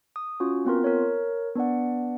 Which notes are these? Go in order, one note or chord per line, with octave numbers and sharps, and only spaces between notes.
D#6
C#4 F4 F#4
B3 C4 F4 A#4
A#4 C#5
B3 D4 D5 F#5